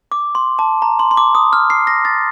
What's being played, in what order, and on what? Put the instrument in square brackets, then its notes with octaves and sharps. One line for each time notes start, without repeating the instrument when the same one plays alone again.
[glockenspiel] D6
C6
A5
A#5
C6
C6
D6
D#6
F6
C7
A#6
A6